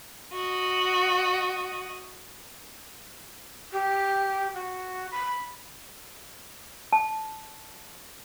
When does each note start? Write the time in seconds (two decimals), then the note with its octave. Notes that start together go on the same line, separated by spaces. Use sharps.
0.32 F#4 D#5
3.72 G4
4.54 F#4
5.11 B5
6.93 A5